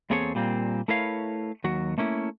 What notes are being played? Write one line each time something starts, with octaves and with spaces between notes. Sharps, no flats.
E2 A#3 C4 G#4 A4 C#5
A#2 G3 A#3 C4
A3 E4 A#4 B4 C#5 F5
D#2 F#3 F#4
A3 A#3 C#4 E4